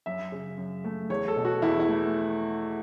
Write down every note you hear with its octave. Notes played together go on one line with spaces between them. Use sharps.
F#2 E5
C#3
F#2
A3
E2 C#5
A4
B2
F#4
E2 E4
E4
A3